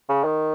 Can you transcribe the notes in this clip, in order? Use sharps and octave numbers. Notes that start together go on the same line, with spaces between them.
C#3
D#3